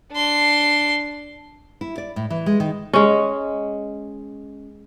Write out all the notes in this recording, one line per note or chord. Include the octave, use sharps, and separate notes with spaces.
D4 C6
E4
D5
A2
E3
G#3
D#3
G#3 C#4